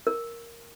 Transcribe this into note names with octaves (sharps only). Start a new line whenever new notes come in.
A#4